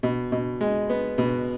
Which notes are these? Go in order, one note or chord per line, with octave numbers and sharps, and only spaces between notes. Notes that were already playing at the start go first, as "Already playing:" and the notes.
B2
B2
G#3
B3
B2